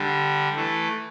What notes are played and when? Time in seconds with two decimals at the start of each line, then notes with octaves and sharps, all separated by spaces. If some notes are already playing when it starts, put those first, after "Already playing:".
Already playing: D3 G3
0.56 E3 A3